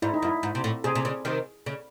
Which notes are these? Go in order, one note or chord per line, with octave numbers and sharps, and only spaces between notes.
G#2 E4
D#4
F#2
E4
G#2
C3
A2
C3 G#4
C3
C#3
C3 D#3
C#3